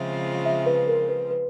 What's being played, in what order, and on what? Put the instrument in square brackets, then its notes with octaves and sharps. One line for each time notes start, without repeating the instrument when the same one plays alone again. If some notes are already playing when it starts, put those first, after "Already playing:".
Already playing: [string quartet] C#3 F3 G#3 C4 F4 [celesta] E5
[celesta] E5
B4
A#4
B4
B4